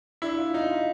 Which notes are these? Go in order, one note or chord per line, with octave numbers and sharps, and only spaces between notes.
D4 E4
F4
D#4 F4
F4